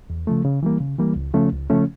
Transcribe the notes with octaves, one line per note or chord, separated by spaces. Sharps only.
E2
C#3 F3 A3
C#3
E3 G3 A#3
C#3
E3 G3 A#3
C#2
C#3 F3 A3 C#4
C#2
C#3 F3 A3 C#4